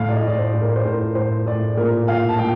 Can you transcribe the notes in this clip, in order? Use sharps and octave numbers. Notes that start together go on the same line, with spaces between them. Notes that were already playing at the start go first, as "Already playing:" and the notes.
Already playing: A2 F5
D5
D#5
A2
D5
C5
A2
A#4
C5
A2 A#4
A2 C5
A2 D5
A#2 A#4
A#2 F5
A5
A#2 G5